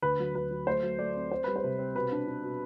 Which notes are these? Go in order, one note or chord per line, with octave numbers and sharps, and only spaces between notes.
D2 B4
F#3
D2 B4
F#3
A3 C5
F#3
A3 D5
C4
C4 C5
G3 B4
C5
C3
C4
B2 B4
D4
D4
B2